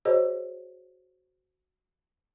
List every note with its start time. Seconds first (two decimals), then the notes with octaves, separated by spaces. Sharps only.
0.05 F#4 G#4 A#4 C5 C#5 D#5